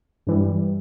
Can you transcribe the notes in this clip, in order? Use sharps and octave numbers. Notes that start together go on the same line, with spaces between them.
G2 E3 G3